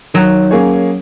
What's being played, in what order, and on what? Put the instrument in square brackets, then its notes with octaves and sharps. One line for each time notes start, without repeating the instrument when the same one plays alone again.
[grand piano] D#3 [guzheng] F#3
[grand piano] A#3 C#4 G#4 C#5